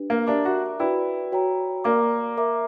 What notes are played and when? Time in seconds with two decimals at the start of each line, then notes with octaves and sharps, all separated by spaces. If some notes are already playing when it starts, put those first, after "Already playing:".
Already playing: D4 G4 B4
0.10 A#3
0.27 D4 G4 A#4 E5 A#5 D6
0.45 F#4
0.80 E4 F#4 B4 D5 G5
1.32 F#4 C#5 G5 A#5
1.84 A#3 A#4 D5 A#5 D6
2.37 A#4 E5 A#5 D6